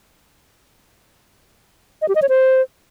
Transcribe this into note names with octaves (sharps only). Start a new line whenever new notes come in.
D#5
G4
D#5
C#5
C5